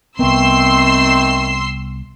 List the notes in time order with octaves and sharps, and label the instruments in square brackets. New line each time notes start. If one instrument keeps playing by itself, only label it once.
[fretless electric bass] C2 B3 [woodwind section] D#3 A3 C4 [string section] C6 E6 C7